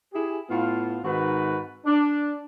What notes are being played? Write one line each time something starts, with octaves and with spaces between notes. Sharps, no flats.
E4 G4 G#4
A2 B3 F4
G#2 D#3 C4 F#4 B4
D4